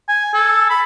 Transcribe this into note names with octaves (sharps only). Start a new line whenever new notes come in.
G#5
A4
B5